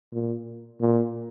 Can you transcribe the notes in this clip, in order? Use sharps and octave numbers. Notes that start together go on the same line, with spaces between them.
A#2
A#2